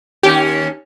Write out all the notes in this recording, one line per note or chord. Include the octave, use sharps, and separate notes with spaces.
D#2 C#4 G4